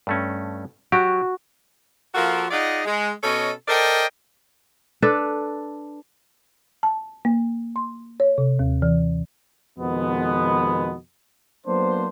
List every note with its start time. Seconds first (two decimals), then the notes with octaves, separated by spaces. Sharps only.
0.07 G2 A3 C#4
0.92 F#3 F#4 G4
2.15 F3 A#3 F4 F#4 A4 A#4
2.51 D#4 F4 G#4 D5 D#5 F#5
2.86 G#3
3.23 B2 C#4 A4 C#5 D#5
3.68 A4 A#4 C5 D5 D#5 G5
5.02 D4 A4 B4
6.83 A5
7.25 A#3
7.76 C6
8.20 C#5
8.38 C3
8.59 D#2
8.82 E3
9.79 F2 B2 D#3 G#3 B3
11.67 F#3 A#3 B3 D4 C5